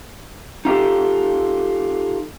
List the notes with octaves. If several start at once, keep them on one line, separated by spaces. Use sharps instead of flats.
D#4 F4 G4 A4